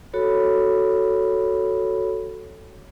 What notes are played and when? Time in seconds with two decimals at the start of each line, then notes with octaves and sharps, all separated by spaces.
0.13 F#4 A4 C#5 B5